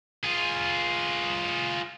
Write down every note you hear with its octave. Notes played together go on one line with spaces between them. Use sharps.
F4 G#4